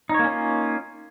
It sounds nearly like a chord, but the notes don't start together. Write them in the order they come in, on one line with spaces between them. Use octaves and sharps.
D#4 C#5 A#3 C#4 F4